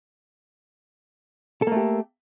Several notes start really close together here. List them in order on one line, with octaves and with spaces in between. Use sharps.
A4 A#3 A3 G4